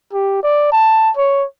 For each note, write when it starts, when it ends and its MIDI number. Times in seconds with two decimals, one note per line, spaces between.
0.13 0.43 67
0.43 0.67 74
0.72 1.10 81
1.16 1.45 73